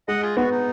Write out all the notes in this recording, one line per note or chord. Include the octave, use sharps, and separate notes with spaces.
G#3 D#5 F#5
F4 G#4
B3 F#4
D#4